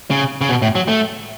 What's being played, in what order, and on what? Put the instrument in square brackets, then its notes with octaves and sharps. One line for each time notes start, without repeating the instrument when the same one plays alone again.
[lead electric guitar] C#3
C#3
B2
A2
F#3
A3